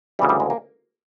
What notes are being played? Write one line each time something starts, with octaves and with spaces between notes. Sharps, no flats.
D2 C#3 E3 G3
G3
G#3
A#3